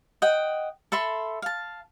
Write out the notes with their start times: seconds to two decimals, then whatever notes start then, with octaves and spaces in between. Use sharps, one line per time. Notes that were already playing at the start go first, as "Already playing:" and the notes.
0.22 D#5 F#5 G5
0.92 A4 E5 B5 C6
1.42 F5 A5